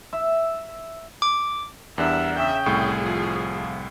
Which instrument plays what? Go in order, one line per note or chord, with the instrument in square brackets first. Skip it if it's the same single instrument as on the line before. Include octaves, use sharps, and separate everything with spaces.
[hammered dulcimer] E5
[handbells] D6
[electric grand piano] E2 D4 [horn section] G3 A#4 F#5 [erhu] E5
[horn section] C#3 G5 [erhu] E5
[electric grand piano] C2 A2 C#6 [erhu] G#4
[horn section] F3